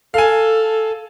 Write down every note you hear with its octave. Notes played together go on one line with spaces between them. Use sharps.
A4 F5 G#5